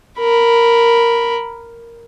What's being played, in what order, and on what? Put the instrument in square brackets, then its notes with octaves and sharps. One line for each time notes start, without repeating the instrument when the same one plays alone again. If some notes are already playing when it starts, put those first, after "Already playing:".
[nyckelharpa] A#4 B5